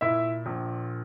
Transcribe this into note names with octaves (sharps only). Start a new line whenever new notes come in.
A#2 E4 E5
A#1